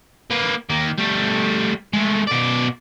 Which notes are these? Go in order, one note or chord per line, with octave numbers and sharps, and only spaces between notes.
A#3 B4
D#3 A#3
G3 A3
G#3 A3
B2 D5